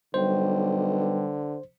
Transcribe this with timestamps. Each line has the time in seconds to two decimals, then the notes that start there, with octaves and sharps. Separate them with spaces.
0.14 B1 D3 G3 B4 C5 G5